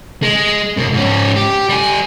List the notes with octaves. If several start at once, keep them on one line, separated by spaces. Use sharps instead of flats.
G#3
F#2 B2
G#2 C#4
G4
G3 G#5